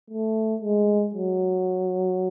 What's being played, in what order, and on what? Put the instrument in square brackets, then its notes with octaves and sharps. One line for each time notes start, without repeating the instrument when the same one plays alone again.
[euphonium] A3
G#3
F#3